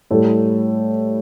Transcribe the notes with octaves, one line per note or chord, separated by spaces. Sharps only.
A2 G3 A4